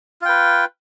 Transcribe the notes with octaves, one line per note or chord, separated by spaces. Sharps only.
F4 B4 G5